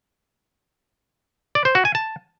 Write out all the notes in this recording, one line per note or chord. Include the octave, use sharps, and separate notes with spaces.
D5
C5
F#4
G#5
A5